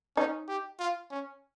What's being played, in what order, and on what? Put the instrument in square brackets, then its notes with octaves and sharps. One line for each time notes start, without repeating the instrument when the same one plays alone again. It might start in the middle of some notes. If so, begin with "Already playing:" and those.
[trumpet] C#4 [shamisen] D#4
[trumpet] G4
F4
C#4